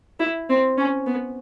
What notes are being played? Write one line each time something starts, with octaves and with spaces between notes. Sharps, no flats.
E4
C4
C#4
B3